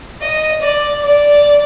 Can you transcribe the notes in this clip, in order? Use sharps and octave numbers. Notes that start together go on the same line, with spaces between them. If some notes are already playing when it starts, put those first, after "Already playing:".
D#5
D5
D5